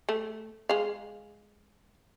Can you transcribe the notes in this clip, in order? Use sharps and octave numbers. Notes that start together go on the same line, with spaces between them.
A3
G#3 F5